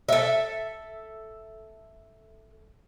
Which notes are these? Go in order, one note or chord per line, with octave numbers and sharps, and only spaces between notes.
A4 E5